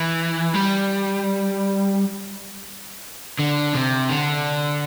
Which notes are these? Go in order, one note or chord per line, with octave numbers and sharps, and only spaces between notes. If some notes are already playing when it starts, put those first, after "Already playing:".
Already playing: E3
G3
D3
C3
D3